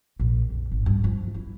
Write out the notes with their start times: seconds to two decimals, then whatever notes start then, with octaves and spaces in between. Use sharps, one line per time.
0.19 A#1
0.49 F2
0.71 G#1
0.86 G2
1.04 F3
1.34 E4